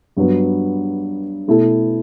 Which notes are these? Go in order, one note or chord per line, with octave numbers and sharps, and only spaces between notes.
G2 F#3 B3
B2 A3 E4 A4